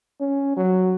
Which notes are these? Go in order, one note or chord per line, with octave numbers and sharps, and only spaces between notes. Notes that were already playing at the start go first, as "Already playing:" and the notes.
C#4
F#3